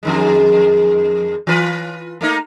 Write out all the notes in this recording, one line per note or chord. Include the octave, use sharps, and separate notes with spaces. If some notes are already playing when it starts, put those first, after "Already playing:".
F2 D#3 G#3
E3 F4 B4
A3 A#3 D#4